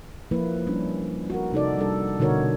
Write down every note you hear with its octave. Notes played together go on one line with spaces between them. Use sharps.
F3 A#3 E4 B4
G3 C#4 D4
F#4 A#4
C3 D#4 A4 D5
G3 D4 A4
B2 D3 D#4 F#4 A#4 C#5